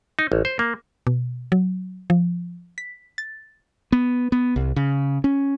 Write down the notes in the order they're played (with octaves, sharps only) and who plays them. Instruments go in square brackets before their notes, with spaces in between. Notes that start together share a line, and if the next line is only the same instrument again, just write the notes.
[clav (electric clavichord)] D#4
A1
C5
A#3
[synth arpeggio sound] B2
F#3
F3
B6
A6
[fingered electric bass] B3
B3
C2
C#3
C#4